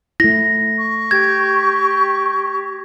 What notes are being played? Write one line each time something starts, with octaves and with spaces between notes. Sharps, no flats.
A3 E4 A#6
C#6
G4 G#6